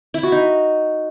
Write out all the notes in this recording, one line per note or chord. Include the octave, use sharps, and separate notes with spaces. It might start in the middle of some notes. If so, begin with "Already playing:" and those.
E4
F#4
D#4